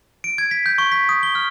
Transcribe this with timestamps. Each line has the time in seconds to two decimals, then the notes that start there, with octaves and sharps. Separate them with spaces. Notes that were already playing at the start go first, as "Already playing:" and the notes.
0.24 D7
0.38 G#6
0.51 B6
0.66 G6
0.78 C#6
0.92 B6
1.09 D#6
1.23 G7
1.35 F6